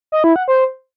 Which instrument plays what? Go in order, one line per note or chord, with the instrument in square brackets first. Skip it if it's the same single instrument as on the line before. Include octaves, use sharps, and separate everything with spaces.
[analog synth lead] D#5
E4
F#5
C5